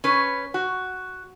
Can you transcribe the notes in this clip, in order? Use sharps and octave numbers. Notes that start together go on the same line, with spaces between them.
C#4 B4
F#4